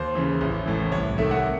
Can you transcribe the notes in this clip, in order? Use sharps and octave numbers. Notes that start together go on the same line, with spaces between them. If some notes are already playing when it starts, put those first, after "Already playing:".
Already playing: D#2 C5
C#3 E3
A1
A2 E3
C2 C#5
C3 D#3 A3 E5
F#5